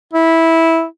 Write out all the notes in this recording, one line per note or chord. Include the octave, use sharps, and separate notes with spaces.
E4